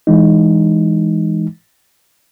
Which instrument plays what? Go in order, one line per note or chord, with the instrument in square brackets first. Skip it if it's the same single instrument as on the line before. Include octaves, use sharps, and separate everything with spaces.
[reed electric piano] E3 G#3 D#4